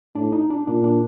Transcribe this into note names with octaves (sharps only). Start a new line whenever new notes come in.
A2 D4
D#4
D4
A#2 D4
D4